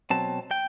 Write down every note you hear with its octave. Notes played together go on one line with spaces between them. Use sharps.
B2 F#3 C4 A5
G5